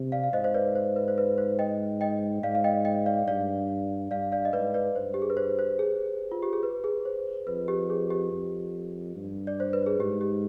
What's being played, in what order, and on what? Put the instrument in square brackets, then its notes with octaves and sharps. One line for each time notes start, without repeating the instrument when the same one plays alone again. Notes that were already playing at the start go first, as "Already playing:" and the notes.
Already playing: [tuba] C3
[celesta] D5 F5
F5
[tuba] G#2 [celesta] C5 D#5
[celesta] C5
B4 D5
C5
B4
C5
B4
C5
D#5 G5
D#5 G5
[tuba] G#2 [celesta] D5 F5
[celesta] F5
D#5 G5
D#5 G5
D5 F5
[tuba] G2 [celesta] D5 F5
[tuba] G2 [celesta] D5 F5
[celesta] D5 F5
D#5
[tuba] G#2 [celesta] B4 D5
[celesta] B4 D5
[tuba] G2 [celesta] C5
[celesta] G4
G#4
B4
C5
C5
G#4
F4
G4
G#4
B4
G#4
C5
[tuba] F2 [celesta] B4
[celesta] G4
G#4
G4
[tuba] F2
G2
[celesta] D5
C5
B4
G#4
[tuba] G#2 [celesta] G4
[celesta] G4